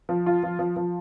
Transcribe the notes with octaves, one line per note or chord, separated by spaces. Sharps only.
F3
F4
F3
F3
F3